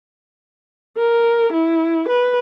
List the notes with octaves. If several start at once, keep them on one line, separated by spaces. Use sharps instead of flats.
A#4
E4
B4